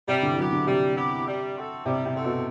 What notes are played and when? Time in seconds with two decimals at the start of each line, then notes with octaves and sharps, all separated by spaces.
0.08 C3 G3
0.23 D3
0.30 E3
0.37 F#3 B3 E4 G4
0.52 D3
0.67 C3 G3
0.96 B3 E4 G4
1.26 G3
1.56 C4 F#4 A4
1.85 C3 G3
2.05 C3
2.15 C4 F#4 A4
2.25 B2